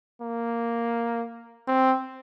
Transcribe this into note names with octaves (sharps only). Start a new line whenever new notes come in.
A#3
C4